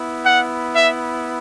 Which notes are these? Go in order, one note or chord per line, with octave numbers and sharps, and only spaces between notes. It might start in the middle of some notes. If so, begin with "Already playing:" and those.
Already playing: B3 E4
F#5
E5